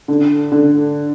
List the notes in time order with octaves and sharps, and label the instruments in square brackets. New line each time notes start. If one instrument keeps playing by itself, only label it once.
[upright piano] D3
D3